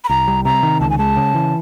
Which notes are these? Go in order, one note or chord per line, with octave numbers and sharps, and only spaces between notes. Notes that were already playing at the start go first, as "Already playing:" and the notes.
B5
C2 A#5
G3
C3 A#5
D#3
C#2 A5
G#5
G#3 A5
C#3
E3